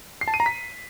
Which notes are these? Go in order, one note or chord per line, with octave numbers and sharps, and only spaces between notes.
C7
A5
D#7
A#5
B6